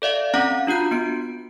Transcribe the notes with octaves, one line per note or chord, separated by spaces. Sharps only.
A4 D5 E5 F5
C4 C#4 F5 F#5 A#5
D4 F4 F#4 G6
B3 D7